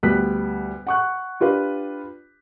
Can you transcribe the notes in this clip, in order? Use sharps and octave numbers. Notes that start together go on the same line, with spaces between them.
D2 G3 B3 F#6 B6
F#5 C#6 F#6
D4 F4 G4 B4